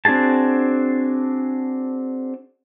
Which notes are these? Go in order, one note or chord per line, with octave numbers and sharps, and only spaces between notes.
C4 D4 F#4 G#4 A5